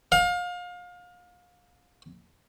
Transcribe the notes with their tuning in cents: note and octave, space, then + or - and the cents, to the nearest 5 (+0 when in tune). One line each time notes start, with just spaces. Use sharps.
F5 +30